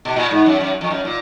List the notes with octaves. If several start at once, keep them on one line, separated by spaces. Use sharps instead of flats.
B2
A#2
G#2
F#2
F#2
F2
F#2
A#2